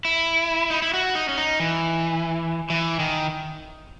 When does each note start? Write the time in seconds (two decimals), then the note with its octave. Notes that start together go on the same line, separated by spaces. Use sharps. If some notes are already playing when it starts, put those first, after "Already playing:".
0.05 E4
0.70 D#4
0.82 E4
0.94 F#4
1.15 D#4
1.29 C#4
1.38 D#4
1.60 E3
2.70 E3
3.00 D#3